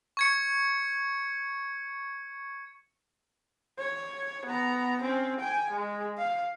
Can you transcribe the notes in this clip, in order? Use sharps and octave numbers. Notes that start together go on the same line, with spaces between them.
C#6 G#6 C#7
C#5
B3 A#5
C4 C#4
G5 G#5
G#3
F5